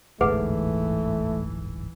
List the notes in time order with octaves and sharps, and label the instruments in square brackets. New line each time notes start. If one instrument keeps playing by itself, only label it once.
[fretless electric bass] D1 G1 G#2 [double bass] E3 [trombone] A3 [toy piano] G#4 B4 F#5